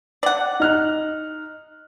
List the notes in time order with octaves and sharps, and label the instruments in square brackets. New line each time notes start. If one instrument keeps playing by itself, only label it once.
[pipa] D5 F#5
[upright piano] D#4 F6 F#6